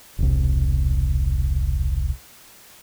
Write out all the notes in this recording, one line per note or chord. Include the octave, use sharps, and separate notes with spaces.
E1 C2